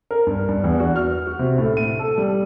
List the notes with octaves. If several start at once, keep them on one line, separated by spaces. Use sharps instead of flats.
A#4
G2
G2
E2
F#4
F6
F#4
C3
A2
D#7
A4
G3